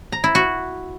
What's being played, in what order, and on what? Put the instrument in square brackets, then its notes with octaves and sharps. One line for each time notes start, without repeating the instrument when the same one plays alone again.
[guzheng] A#5
E4
F#4